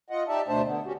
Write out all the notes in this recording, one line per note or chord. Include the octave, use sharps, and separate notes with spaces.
F4 D#5 F#5
D#4 G4 D5 E5 A5
D2 B2 A3 D4 C5 A5
D3 B3
C#4 F#4 G4